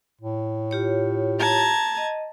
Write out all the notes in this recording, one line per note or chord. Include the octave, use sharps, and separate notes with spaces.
A2
F4 G4 C#5
A5 A#5 G#6
D#5